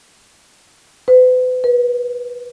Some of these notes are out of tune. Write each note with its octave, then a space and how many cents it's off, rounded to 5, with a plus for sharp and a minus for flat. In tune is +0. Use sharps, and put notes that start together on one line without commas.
B4 +40
B4 -25